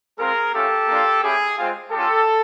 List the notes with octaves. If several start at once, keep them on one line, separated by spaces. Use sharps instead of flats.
G#3 C4 F4 G#4 A#4
A3 C#4 F4 G4 A4
A#3 D4 F4
A3 C#4 E4 G4 G#4
G#3 C4 F4
G#3 C#4 F4 G4 A4